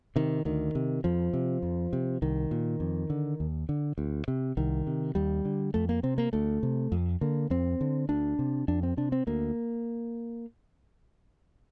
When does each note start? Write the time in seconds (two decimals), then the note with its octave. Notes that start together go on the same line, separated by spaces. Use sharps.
0.16 C3 D#3
0.45 D2 D#3
0.75 C3
1.04 F2 F3
1.33 C3
1.62 F2
1.93 C3
2.22 C2 D#3
2.51 A#2
2.80 F2
3.10 D3
3.40 D#2
3.69 D3
3.98 D2
4.28 C3
4.57 C2 D#3
4.87 C3
5.15 D#2 G3
5.45 D3
5.74 F2 A3
5.89 A#3
6.03 C3 C4
6.18 A#3
6.33 D2 A3
6.63 C3
6.92 F2
7.21 D3 A#3
7.50 F2 C4
7.81 D3
8.09 D2 D4
8.39 C3
8.68 F2 D4
8.83 C4
8.97 C3 D4
9.12 C4
9.27 D2 A#3